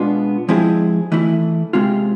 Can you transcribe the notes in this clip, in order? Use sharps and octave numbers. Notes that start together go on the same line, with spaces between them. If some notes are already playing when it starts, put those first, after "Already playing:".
Already playing: B2 G#3 B3 D4 F4
F3 G#3 C4 E4 G#4
E3 A3 E4
C3 G#3 C4 F4